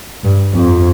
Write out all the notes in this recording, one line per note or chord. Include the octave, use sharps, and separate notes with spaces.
G2
F2